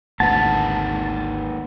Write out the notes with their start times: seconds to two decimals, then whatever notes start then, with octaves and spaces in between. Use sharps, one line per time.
0.20 G#1 D2 A#3 D#4 B4 F#5 A5